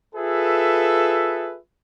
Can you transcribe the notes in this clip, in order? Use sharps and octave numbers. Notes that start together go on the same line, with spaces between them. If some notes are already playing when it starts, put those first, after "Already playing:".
F4 G#4 A4 B4 E5